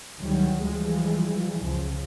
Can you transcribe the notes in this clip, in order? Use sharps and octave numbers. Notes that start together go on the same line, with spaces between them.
D2 D#3 E3 F#3 G3
E3 F3 G3 G#3
C#2 F#2 C#3 F3